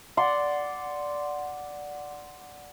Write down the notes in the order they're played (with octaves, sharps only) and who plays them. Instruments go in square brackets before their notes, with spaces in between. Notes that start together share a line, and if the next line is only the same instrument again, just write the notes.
[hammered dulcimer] D5 F#5 C6